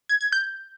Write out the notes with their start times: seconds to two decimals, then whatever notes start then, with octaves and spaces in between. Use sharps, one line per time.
0.09 G#6
0.21 G#6
0.32 G6